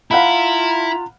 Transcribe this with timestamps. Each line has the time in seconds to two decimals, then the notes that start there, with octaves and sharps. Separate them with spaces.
0.11 E4 F4 F5 F#5 A#5 B5